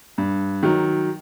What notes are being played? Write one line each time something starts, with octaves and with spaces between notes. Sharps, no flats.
G2
D#3 F#3